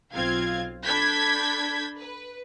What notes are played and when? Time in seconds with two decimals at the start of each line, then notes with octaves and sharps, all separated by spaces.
0.13 B1 C4 F4 F5 G#6
0.85 D4 A4 B5 G6 G#6 B6
1.96 B4